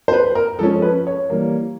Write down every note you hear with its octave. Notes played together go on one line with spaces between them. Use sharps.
C5
B4
A#4
F3 G#3 C#4 A4
B4
C#5
E3 G3 A#3